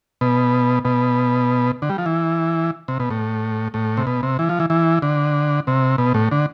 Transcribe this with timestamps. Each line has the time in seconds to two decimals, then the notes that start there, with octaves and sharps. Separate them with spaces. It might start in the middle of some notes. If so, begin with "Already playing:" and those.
0.21 B2
0.85 B2
1.82 D3
1.90 G3
1.98 F3
2.06 E3
2.88 C3
3.00 B2
3.10 A2
3.74 A2
3.97 C3
4.07 B2
4.23 C3
4.39 E3
4.49 F3
4.60 E3
4.70 E3
5.02 D3
5.67 C3
5.98 B2
6.14 A2
6.32 D3